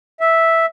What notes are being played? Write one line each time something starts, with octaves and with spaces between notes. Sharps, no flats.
E5